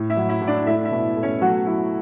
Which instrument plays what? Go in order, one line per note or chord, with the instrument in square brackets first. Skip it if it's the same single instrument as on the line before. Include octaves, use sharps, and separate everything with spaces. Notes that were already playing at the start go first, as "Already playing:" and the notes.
Already playing: [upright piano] A2
E4 E5
F#3
E4 E5
A2
D4 D5
A3 E4 E5
E4 E5
B2
A3
C#4 C#5
F#3 A3 F#4
F#3 E4